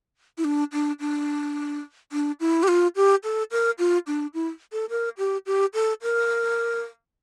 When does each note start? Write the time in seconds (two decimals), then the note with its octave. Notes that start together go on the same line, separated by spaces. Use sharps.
0.38 E4
0.44 D4
0.73 D4
1.00 D4
2.12 D4
2.40 E4
2.63 G4
2.68 F4
2.96 G4
3.24 A4
3.51 A#4
3.79 F4
4.07 D4
4.34 E4
4.72 A4
4.90 A#4
5.18 G4
5.46 G4
5.74 A4
6.02 A#4